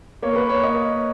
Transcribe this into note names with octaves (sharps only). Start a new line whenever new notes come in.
A#3 C#5
B4
C#5
A#3 D#5